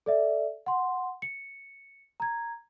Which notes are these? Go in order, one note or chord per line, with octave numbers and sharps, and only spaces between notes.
A4 D5 E5
F#5 C6
C#7
A#5 G#6